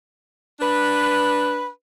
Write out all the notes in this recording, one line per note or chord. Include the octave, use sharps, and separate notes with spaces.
D4 B4